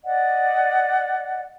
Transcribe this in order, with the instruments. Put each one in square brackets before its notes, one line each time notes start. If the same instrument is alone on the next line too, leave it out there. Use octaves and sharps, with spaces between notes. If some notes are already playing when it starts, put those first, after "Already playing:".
[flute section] D5 D#5 F#5